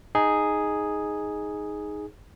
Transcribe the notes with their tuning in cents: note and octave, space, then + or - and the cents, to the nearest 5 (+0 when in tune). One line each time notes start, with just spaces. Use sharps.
D#4 +0 G#4 +0